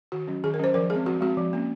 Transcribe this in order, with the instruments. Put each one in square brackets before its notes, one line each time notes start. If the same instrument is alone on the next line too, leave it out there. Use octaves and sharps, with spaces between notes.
[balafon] D#3 F#4
F#3 C#4
D#3 G#4
A#4
F#3 C#4 C5
F3 A#4
G#3 C4 G#4
F3 F#4
G#3 C4 F#4
F3
A#3 C#4